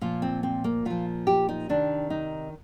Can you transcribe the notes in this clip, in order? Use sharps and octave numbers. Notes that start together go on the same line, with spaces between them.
A#2 F3 F4
C4
C4
A#3
A#2 F3 F4
G4
D#4
C3 D#3 D4
D#4